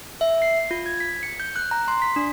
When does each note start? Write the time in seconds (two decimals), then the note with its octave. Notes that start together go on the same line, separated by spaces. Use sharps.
0.21 E5
0.42 C7
0.71 F4
0.86 G#6
1.00 B6
1.23 C#7
1.40 G6
1.56 F#6
1.71 A#5
1.88 C6
2.02 B6
2.16 D4